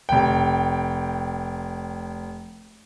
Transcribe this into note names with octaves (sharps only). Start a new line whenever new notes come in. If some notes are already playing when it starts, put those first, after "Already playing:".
F1 G5